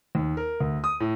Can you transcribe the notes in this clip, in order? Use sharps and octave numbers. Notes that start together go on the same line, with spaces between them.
D#2
A#4
D2
D#6
A2